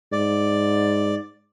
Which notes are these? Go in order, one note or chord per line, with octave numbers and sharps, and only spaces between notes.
G#2 D5